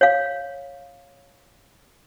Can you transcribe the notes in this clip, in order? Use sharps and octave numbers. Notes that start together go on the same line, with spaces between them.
C#5 F5